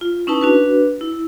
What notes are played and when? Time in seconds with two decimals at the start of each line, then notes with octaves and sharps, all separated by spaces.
0.01 F4
0.27 C#4 D#4 E4 B4 A5
0.41 D4 F#4 B4
1.01 E4